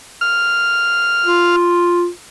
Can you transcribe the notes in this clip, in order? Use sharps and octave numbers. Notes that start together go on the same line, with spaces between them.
F6
F4